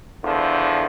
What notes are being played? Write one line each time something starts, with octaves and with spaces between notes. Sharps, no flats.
E2 D3 F3